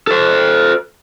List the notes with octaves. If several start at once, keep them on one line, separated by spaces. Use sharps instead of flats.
A4 C5